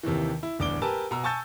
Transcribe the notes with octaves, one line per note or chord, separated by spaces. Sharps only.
D#2 C3 D#3 E3
E4
D1 E2 D4 D6 D7 G7
G4 A#4 B4 G#5 A5 E6
B2 A#5 E6
G#5 A5 C#6 E6 G6 A6